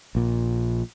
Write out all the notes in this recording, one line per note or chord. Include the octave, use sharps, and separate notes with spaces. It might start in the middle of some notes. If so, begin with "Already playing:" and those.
A#1 A#2